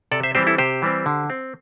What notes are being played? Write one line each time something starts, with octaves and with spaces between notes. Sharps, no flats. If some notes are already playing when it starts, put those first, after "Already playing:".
C3 A4 D5
C5 E5
E3 G3 C4 G4 C5
E4 A4
C3 G4 C5
E3 G3 C4
D3
C4